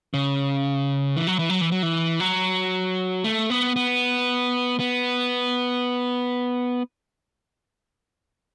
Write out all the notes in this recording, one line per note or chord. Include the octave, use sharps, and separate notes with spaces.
C#3
E3
F#3
E3
F#3
E3
F#3
E3
F#3
A3
B3
B3
B3